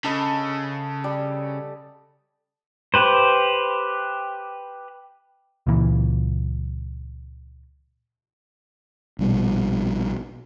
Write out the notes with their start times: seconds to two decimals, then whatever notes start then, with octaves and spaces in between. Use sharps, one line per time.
0.04 C#3 A4 D#5 B5
1.04 G3
2.94 G4 B4 C5
5.67 C#2 A#2 E3
9.19 A#1 B2 G3